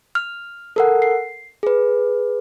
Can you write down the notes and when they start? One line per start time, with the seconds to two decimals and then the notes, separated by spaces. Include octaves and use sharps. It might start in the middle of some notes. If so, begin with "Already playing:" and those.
0.15 F6
0.76 A4 A#4 F#5
1.02 C7
1.63 G#4 B4